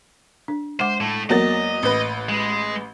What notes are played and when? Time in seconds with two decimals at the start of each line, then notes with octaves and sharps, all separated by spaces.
0.48 D4
0.80 G#3 C5 F#5 D6
1.01 A2 A3
1.30 E2 F#3 A#3 A#4 D#5 A6
1.83 A1 B4
2.29 G#3